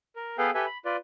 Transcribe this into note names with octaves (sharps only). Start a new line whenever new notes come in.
A#4
B3 G#4 A4 B4 F5 G5
G4 A4 B4 E5 G#5
B5
F4 B4 D5